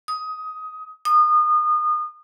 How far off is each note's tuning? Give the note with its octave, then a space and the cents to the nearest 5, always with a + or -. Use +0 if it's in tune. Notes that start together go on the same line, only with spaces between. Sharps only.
D#6 +15
D#6 -30